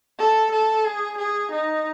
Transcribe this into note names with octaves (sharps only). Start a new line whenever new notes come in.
A4
A4
G#4
G#4
D#4